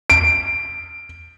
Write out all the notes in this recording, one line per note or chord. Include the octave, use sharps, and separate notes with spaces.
D7